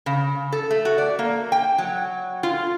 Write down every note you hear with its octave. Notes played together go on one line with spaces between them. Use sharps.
C#3
A4
A3
F#4
D5
A#3
G5
F#3
F4